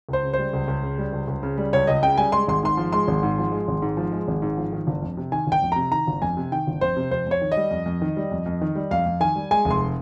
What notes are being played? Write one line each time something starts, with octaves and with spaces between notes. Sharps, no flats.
C#2 C5
C#3
G3 C5
C#2
C#2
C#3
G3
C#2
C#2
C#3
G3
C#2 C#5
C#2 D#5
C#3 G5
G3 G#5
G#3 C6
G#1 C6
G#2 C6
F3
G#3 C6
G#1
G#2
F3
G#3
G#1
G#2
F3
G#3
G#1
G#2
F3
D#3
G1
F2
C3
D#3 G#5
G1
G5
F2
C3 A#5
D#3 A#5
G1
F2 G#5
C3
D#3 G5
G1
F2 C5
C3
F2 C5
F2 C#5
D#3
D#5
G3
F2
F2
D#3
G3
F2
F2
D#3
G3
F2 F5
F2
D#3 G#5
G3
G#3 G#5
F1
C6